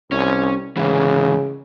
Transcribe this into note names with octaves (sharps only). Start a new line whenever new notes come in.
C2 C#4
G#2 C#3 E3